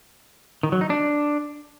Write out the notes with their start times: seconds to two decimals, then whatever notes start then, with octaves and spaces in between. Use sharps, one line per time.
0.63 D#3
0.72 F#3
0.81 D#4
0.90 D4